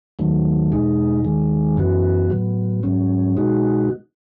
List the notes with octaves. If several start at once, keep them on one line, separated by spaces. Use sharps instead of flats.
D#2 D#3 F#3 A3
E2 B2 G#3 D#4
D#2 D#3 G#3
F#2 C#3 E3 B3 F#4
A2 F#3 B3
G#2 F#3 C#4
B2 G#3 D#4 F#4